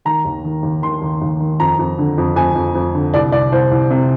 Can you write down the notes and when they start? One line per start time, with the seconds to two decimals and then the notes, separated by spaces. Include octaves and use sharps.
0.05 D#3 A#5
0.25 D#2
0.44 D#3
0.63 D#2
0.82 D#3 C6
1.01 D#2
1.21 D#2
1.40 D#3
1.60 F2 A#5
1.79 F2
1.98 D3
2.18 F2
2.36 F2 G#5
2.56 F2
2.75 F2
2.95 D3
3.14 C2 D5
3.32 C2 D5
3.52 C2 C5
3.71 C2
3.90 C3